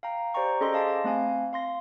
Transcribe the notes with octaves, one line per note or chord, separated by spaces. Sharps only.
F5 G5 A#5
G4 C5 D5 G5 A#5 C#6
C#4 G#4 A4 C5 D#5 C6
D#5 F5 A5 C6 D6
A3 C4 F5 G#5
F5 C6 A#6